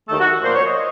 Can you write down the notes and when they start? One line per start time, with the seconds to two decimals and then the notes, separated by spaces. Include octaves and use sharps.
0.08 D#2 D#3 A3 A4
0.20 F#4
0.43 A#2 F3 A#3 C5
0.55 C#5
0.66 D#5